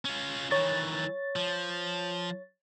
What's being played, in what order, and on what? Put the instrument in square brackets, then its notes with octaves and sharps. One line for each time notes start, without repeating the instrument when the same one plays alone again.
[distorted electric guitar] C#4 F4
[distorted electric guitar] D#3 E3 [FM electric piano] C#5 A6
[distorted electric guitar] F3